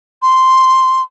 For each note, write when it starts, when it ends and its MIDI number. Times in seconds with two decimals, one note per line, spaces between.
0.22 1.02 84